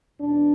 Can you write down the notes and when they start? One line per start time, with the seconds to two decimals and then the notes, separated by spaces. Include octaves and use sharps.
0.21 E2 B2 D4